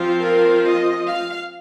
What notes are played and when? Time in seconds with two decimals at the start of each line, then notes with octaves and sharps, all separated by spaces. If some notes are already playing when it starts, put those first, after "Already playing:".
Already playing: F3 C4 F4
0.22 A#4
0.65 D#5
1.06 F5